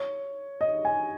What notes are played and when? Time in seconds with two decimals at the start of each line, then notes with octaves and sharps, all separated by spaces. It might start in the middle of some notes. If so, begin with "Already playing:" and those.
Already playing: C#5
0.61 D#5
0.85 G#5